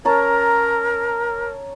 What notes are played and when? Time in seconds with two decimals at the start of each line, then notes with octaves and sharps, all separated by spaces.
0.05 C#4 A#4 A5 A#5